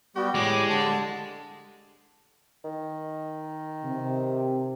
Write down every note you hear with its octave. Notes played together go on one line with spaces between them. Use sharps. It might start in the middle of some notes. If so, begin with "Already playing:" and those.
G3 B3 F#4 G4
A2 G#3 G#4 D6
D3 A5
D#3
C3